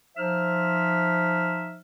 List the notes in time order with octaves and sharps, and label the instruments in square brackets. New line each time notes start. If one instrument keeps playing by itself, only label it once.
[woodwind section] F3 D#4 C5 E5 F6